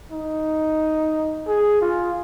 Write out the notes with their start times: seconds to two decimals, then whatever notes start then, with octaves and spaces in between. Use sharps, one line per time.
0.12 D#4
1.47 G#4
1.81 F4